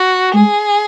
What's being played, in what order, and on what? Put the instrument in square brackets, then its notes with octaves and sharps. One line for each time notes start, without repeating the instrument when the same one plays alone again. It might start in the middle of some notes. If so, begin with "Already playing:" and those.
Already playing: [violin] F#4
[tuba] G#3 [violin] G#4